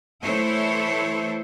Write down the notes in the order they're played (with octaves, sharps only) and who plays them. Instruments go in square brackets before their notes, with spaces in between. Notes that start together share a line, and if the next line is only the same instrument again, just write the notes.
[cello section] E3 A3 E4 A4 C5 C#5